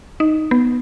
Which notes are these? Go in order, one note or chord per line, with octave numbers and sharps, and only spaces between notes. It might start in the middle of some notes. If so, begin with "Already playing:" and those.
D#4
B3